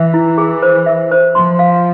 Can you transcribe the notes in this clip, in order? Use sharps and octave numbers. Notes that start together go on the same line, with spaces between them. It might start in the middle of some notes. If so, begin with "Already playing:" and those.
Already playing: E3 E5
E4
G#4
C5
E5
C5
F3 C6
F5